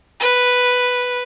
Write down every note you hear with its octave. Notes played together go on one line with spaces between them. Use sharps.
B4